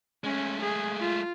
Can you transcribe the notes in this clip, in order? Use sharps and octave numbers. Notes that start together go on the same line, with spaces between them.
G#3 A3 C#4
G#4
F4